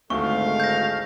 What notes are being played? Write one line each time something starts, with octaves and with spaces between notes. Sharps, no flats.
G#1 D2 E3 A3 F#4 A4 F5 C#6
G6 A#6